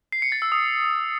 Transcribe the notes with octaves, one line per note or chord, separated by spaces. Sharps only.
C7
C#7
A6
E6
D#6